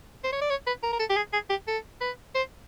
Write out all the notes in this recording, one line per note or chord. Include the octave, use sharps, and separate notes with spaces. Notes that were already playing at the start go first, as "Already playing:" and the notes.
C5
C#5
D5
C#5
B4
A#4
A#4
A4
G4
G#4
G#4
G4
A4
B4
C5